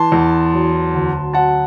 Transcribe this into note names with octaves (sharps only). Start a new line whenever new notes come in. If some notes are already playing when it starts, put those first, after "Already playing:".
Already playing: E3 A5 C6
E2
F#3
D2
F#3 F#5 A5